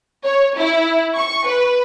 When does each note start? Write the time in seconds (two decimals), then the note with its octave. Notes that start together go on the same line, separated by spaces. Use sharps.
0.25 C#5
0.58 E4
1.17 C#6
1.47 B4